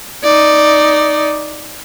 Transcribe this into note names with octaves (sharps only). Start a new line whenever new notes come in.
D#4 D5